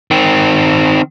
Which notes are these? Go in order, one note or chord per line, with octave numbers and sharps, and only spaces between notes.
D#3 C4